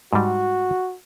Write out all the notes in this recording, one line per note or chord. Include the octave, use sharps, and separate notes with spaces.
G#2 G3 F#4